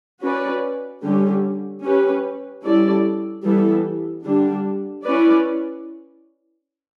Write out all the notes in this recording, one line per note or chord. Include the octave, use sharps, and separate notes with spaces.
C#4 F#4 B4 D5
D3 G3 C#4 G4
C#4 G4 B4
G3 C#4 E4 A4 D5
E3 G3 B3 E4 A4
D3 G3 D4
C#4 E4 B4 D5